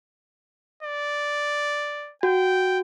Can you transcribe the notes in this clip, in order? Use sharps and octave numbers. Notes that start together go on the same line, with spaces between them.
D5
F#4 G5